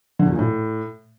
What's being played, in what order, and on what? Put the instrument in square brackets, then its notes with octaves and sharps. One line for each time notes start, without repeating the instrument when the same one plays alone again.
[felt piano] D3
E2
A#2
A2